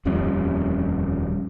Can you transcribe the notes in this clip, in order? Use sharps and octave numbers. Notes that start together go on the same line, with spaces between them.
D#1 F2 G3 C#4